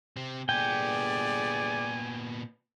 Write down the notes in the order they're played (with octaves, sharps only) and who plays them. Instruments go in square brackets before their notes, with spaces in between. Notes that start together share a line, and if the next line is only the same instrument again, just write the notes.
[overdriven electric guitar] C3 C4
[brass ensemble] G1 G#4 D5 [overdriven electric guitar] A#2 B3 [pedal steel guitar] G5 [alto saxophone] G#5